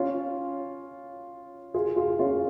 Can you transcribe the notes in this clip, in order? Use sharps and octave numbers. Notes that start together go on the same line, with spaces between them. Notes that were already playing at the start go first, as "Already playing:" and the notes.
Already playing: C#4 F4
F4 G#4
F4 G#4
C#4 F4